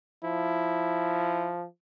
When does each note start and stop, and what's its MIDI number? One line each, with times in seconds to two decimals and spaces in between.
0.24 1.65 53
0.24 1.52 64